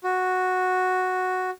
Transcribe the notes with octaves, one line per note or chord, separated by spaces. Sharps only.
F#4